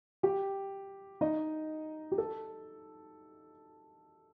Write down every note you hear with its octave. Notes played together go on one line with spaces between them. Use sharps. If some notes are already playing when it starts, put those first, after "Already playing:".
G4 G5
D#4 D#5
G4
A4